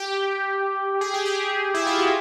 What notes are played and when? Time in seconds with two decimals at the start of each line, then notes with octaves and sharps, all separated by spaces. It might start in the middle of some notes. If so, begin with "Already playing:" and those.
Already playing: G4
1.01 G#4
1.14 G4
1.25 G#4
1.74 E4
1.86 F4
1.98 F#4